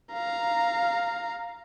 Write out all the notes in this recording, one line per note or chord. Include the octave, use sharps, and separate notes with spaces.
F5 A#5